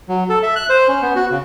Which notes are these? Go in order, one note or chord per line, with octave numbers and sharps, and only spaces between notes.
F#3
A4
E5
F#6
C5
C#4
B3
F#4
C#3